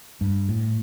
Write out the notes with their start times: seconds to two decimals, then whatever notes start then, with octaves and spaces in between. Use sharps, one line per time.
0.21 G2
0.49 A2